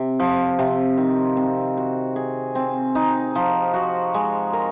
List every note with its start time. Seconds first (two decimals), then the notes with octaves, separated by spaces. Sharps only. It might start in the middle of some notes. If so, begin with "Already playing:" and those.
Already playing: C3
0.20 F3
0.59 C3
0.97 D#3
1.37 C4
1.77 F#4
2.16 G#4
2.55 C4
2.95 D#4
3.35 F3
3.74 F#4
4.14 G#3
4.53 A#4